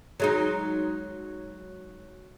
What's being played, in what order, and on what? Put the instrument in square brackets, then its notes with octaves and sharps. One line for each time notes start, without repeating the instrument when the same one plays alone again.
[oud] F#3 G#3 D#4